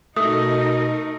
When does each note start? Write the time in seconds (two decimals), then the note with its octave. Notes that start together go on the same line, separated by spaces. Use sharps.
0.16 B2 A3 D#4 A#4 D#6